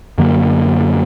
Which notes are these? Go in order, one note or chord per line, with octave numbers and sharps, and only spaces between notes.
F#2 D3 F#3 A#3